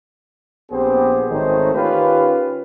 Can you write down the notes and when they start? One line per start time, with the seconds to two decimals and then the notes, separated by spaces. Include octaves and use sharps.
0.71 A#1 B3 C4 G4 G#4 C5
1.30 G#1 D#3 A3 C#4 D#4 C5
1.75 D#3 C#4 F4 G4 B4